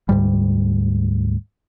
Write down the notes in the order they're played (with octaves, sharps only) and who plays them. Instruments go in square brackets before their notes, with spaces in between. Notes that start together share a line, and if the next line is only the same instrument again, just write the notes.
[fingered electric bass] D2 G#2 G3